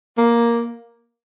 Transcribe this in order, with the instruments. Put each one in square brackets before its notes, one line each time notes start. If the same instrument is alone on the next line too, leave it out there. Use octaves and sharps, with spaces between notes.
[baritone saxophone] A#3